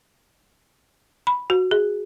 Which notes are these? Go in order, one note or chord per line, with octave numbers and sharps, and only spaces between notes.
B5
F#4
G#4